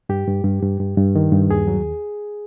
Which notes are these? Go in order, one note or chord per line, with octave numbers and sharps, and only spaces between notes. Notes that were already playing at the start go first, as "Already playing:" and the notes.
G2 G4
G2
G2
G2
G2
G2
D#3
G2
D#2 G#4
F#3